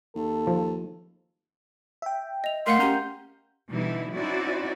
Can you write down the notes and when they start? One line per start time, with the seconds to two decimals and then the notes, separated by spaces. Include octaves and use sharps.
0.15 D#2 A4
0.47 F3
2.02 E5 G5
2.44 D#5 F7
2.67 A3 A#4 F5 F#5 C6
2.80 C#4 G4 A#5 G6
3.69 B2 D3 E3 G3 D#4 E4
4.13 C4 C#4 D#4 E4 F#4 D5